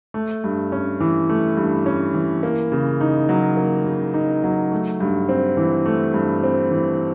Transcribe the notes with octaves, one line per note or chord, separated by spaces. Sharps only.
A3
G2
C#4
E3
A3
G2
C#4
E3
A#3
C#3
D#4
F#3
A#3
C#3
D#4
F#3
A3
G2
C4
E3
A3
G2
C4
E3